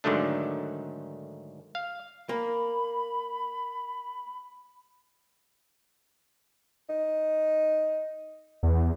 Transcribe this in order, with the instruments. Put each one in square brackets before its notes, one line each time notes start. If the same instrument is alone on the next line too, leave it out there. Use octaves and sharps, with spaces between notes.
[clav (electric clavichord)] G#2 D3 D#3 F#3 A3 D4
F5
[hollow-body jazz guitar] A#3 [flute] B5
[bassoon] D#4
[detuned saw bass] E2